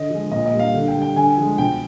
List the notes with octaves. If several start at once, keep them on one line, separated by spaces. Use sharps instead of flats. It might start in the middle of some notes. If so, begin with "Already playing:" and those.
Already playing: D3 D#5
F3 G#3
A#2 D#5
D#5
G3
F5
D3
G5
G3
G5
D3 G#5
F3 G#3
B2 G5